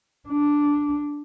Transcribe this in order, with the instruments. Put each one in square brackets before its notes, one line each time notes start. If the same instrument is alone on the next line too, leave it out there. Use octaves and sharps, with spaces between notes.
[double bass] D4